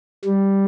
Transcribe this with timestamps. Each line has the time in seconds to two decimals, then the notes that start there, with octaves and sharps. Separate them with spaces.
0.25 G3